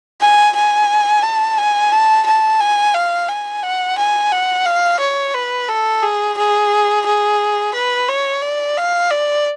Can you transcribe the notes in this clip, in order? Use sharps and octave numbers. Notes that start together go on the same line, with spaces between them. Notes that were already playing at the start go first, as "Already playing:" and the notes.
G#5
G#5
A5
G#5
A5
A5
G#5
F5
G#5
F#5
G#5
F#5
F5
C#5
B4
A4
G#4
G#4
G#4
B4
C#5
D5
F5
D5